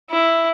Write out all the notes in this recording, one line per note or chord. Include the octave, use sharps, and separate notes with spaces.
E4